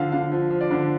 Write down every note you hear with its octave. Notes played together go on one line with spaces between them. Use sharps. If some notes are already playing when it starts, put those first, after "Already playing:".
Already playing: D3 F3 F5
D3 F5
F3
F3
D5
D3